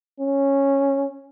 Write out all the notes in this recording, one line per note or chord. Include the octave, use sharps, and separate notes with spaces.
C#4